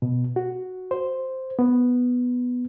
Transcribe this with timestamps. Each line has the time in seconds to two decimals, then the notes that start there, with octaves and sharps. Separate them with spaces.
0.02 B2
0.36 F#4
0.91 C5
1.59 B3